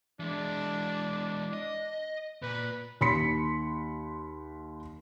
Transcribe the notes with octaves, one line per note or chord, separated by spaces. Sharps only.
E3 G#3 D4
D#5
A#2 B4
D#2 B5 C6 B6 C#7